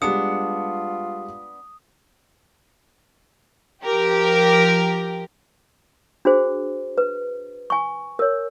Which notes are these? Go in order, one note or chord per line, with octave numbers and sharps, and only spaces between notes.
G3 G#3 B3 D4 F4 D#6 C#7
F3 G4 A#4
D4 F#4 G#4 C5
B4
G#5 C#6
A#4 C#5